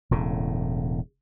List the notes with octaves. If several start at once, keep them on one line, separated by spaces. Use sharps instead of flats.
E1 A2 C#3